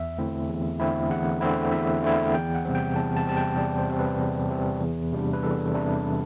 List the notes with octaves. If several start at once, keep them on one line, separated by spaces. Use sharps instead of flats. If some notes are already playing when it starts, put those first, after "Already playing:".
Already playing: E2 E5
D3 A3 C4 E4
E2
D3 A3 C4 E4
E2 F#5
D3 A3 C4 E4
E2 E5
D3 A3 C4 E4
E2 G5
F#5
C3 G3 C4
G5
E2 A5
A5
C3 G3 C4 A5
G5
E2 D5
C5
C3 G3 C4
B4
E2
C3 G3 C4
E2
C3 G3 D4
B4
E2 A4
C3 G3 D4